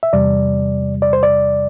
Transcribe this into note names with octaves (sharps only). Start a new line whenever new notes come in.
E5
E2 C3 G3 D5
D5
C5
D5